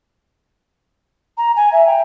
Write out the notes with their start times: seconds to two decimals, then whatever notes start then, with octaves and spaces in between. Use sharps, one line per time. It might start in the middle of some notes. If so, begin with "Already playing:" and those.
1.37 A#5
1.56 G#5
1.72 E5
1.87 G5